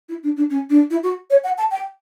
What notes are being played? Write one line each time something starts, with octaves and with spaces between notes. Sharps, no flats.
E4
D4
D4
C#4
D4
E4
F#4
C#5
F#5
A5
G5